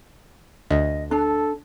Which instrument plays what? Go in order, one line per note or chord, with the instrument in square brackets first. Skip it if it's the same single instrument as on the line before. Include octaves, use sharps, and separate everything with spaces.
[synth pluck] D2 [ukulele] D#5
[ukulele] D4 [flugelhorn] A4